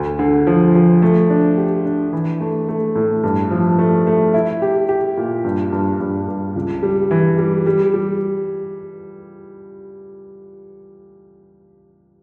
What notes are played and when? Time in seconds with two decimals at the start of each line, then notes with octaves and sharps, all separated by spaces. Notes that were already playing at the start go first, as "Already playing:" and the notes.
Already playing: D2
0.19 D3
0.47 F3
0.75 F3
1.02 A3
1.30 D4
1.57 G4
1.86 D4
2.13 E3
2.40 A3
2.68 A3
2.95 A2
3.23 G2
3.51 F3
3.79 A3
4.07 A3
4.34 E4
4.62 G4
4.89 G4
5.17 A#2
5.44 G2
5.73 G2
6.00 G2
6.28 G2
6.56 C#2
6.83 G3
7.11 E3
7.38 G3
7.66 G3
7.94 G3